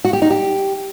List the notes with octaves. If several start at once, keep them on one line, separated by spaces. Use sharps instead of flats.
F#4
G4
D#4
G4